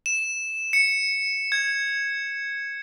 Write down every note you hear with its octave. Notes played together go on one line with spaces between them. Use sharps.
E7
C#7
G#6